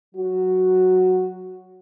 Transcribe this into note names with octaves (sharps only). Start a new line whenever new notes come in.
F#3 F#4